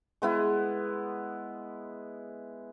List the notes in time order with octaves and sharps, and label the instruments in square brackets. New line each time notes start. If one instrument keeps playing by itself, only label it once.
[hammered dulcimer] G#3 B3 E4